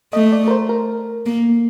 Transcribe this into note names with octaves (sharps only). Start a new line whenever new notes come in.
A3 D#5
D5
A#4
C5
A#4
A#3